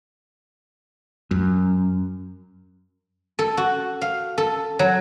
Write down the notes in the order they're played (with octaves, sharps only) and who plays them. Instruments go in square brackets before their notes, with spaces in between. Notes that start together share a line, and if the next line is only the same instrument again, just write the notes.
[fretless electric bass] F#2
[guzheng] A4
F#4
F5
A4
F#3